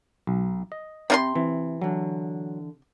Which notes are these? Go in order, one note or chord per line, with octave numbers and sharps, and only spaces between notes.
B1
D#5
C3 C4 F4 B5 C6
E3 C4
D3 E3 F#3